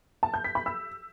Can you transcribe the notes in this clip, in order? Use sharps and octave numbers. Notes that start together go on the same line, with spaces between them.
A5
G6
B6
B5
E6